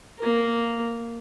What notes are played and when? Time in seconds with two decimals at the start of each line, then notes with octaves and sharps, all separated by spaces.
0.19 A#3 A#4